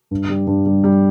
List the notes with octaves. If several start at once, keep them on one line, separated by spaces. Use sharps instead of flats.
G2
G3
G2
G3
G3